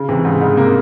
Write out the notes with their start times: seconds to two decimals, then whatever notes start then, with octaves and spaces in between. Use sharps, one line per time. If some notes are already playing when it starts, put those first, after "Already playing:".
Already playing: C#3
0.09 C3 E3
0.25 G#2 C#3
0.41 G#2 C#3
0.57 C3 A#3